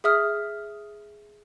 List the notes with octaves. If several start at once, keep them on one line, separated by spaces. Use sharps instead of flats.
G#4 E5 D#6 F6